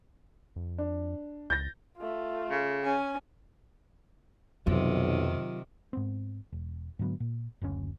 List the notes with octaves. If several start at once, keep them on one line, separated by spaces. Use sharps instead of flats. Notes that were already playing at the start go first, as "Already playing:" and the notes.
F2
D4
C#2 G6 A6 A#6
A3 F4
C#3
C#4 G#5
B1 F2 C3 D#3 F#3 F4
G#2 B3 C4
E1
G#2 D3 F#3 B3
A#2
F#1 D2 A2 C#4